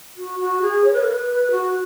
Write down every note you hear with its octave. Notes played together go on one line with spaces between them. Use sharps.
F#4
F#4
G#4
C#5
B4
A#4
B4
F#4